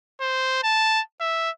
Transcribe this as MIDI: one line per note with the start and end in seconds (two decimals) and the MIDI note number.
0.20 0.59 72
0.63 1.00 81
1.21 1.50 76